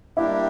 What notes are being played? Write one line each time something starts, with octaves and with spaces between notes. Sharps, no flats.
G3 A#3 D4 E4 G4